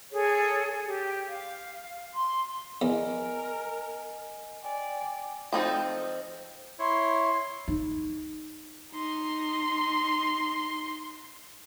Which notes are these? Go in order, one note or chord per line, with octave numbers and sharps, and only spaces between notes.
G#4 A4 C#5
G4
F5
C6
E2 A#4 D#5 G#5
D5 G5 G#5
F3 C4 D#4 A4
E4 C#5 C6
D#4
D#4 C6